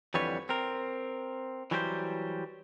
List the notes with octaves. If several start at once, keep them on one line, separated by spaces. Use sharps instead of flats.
F2 D3 E3 G3 B4 C#5
C4 A#4
E3 F#3 G3 G4 A#4 C5